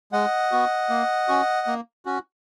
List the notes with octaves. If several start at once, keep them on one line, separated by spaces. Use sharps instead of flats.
G#3 D#5 F#5
B3 F#4
A#3
C#4 F#4
A#3
C#4 F#4